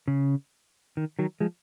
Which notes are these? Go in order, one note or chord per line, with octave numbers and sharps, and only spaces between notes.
C#3
D#3
D#3 F#3
F3 G#3